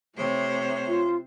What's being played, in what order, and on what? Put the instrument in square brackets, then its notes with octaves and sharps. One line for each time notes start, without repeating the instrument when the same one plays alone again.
[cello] C3 C5 [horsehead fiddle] A3 C#5
[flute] F4